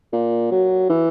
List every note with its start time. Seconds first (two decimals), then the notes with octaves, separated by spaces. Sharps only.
0.13 A#2
0.52 F#3
0.90 E3